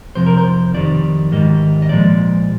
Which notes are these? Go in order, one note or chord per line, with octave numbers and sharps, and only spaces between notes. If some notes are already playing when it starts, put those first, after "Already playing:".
F2 C3 F3 C5
A#4
C5
F2 D#3 G3 D5
G#2 D#3 G3 D#5
D#5
A#2 F3 G#3 D5